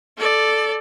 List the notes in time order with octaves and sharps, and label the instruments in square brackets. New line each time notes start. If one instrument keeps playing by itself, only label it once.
[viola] A4 D5